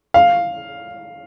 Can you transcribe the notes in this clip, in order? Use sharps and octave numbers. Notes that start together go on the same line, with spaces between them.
F5